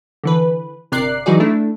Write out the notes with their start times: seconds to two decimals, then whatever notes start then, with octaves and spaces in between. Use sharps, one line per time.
0.24 D3 E3 B4
0.92 G1 C3 A#4 D5 F#6 C7
1.26 E3 F#3 D#4 F#4 G#4 D5
1.40 A3 D4 E4